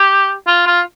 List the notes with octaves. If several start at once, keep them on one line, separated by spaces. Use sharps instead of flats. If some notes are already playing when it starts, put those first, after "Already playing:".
Already playing: G4
F4
F4